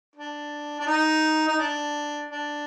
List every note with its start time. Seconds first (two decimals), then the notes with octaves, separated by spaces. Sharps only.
0.15 D4
0.79 D4
0.87 D#4
1.48 D#4
1.58 D4
2.30 D4